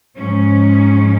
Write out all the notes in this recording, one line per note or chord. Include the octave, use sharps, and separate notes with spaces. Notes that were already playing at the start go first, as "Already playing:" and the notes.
G#2 F3 C#4